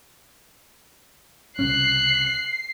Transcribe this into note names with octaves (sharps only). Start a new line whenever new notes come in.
C2 C#3 C#4 F#6 C7